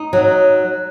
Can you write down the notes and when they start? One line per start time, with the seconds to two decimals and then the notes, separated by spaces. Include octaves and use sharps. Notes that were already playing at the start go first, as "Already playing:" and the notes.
Already playing: D#4
0.13 F#3